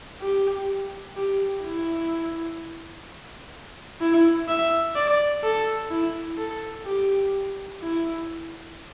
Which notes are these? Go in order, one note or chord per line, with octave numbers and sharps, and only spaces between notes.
G4
G4
E4
E4
E5
D5
A4
E4
A4
G4
E4